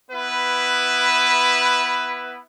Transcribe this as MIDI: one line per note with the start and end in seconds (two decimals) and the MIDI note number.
0.11 2.38 59
0.11 2.38 64
0.11 2.38 71